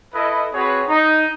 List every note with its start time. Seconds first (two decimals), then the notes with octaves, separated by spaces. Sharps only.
0.13 E4 A4 B4 D#5
0.53 C4 F#4 G#4 B4 C#5
0.87 D#4